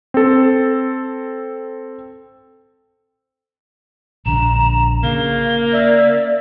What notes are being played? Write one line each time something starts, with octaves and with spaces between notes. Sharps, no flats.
C4 A4
A#1 D3 A#5 E7
C#3 A#3 F5 G7
D5 E5